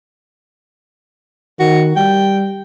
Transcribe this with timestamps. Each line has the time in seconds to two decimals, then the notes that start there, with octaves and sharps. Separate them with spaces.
1.60 D#3 F#4
1.96 G3 G5